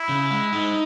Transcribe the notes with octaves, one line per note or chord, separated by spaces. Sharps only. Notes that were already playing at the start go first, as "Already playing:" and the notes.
Already playing: E4
C#3
G#3
D#4